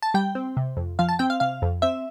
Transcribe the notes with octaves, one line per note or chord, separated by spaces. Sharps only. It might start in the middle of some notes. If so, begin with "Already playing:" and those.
A5
G3 G5
C4
C3
F2
F3 F5
A5
C4 G5
F5
C3 F5
F2
C4 E5